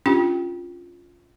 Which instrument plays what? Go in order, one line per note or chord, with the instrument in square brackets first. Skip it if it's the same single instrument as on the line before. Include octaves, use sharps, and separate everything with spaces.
[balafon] C#4 D4 F4 G4 G5